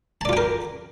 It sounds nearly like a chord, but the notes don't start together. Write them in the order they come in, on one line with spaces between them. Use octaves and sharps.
A5 D5 F4 G5 A#4